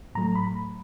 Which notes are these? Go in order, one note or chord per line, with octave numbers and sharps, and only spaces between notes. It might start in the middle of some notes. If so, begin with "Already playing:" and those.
A2 F#3 A3 A#5
B5